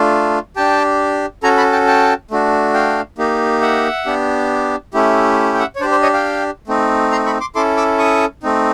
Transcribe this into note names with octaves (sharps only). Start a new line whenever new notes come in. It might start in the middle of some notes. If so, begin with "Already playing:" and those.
Already playing: A3 D4 F4
D4 G4 G5 A5
C#4 F#4 A4 G#5 A#5
A5 B5
G5 A5
G5 A5
A3 D4 F#4
F5 G5
A#3 D#4 G4
E5 F#5
B3 D4 G4
A3 C#4 E4 G4
G5
E5 F#5
C#5
D4 G4 C5 D5
C5 D5
C#5 D#5
F5 G5
A3 C4 D#4
A#5 C6
B5 C#6
C6 D6
C#4 E4 A4 C6 D6
D6 E6
C#6 D#6
A3 C4 D#4